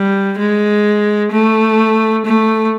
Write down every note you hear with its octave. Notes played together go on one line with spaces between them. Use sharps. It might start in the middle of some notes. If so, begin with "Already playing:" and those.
Already playing: G3
G#3
A3
A3